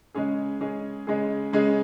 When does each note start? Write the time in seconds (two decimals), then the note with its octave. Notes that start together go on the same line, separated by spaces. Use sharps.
0.15 C#3 G#3 C#4 G#4
0.60 C#3 G#3 C#4 G#4
1.07 C#3 G#3 C#4 G#4
1.53 C#3 G#3 C#4 G#4